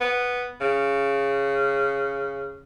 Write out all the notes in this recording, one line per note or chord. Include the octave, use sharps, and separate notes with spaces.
B3
C#3